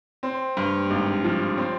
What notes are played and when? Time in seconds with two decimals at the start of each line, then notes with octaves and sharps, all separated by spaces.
0.23 C4
0.57 G2
0.90 G#1
1.24 F3
1.57 C4